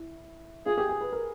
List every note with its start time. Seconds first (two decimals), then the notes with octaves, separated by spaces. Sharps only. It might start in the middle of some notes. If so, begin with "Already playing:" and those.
Already playing: E4
0.66 F4 G#4
0.78 G4
0.89 G#4
1.01 B4
1.12 A#4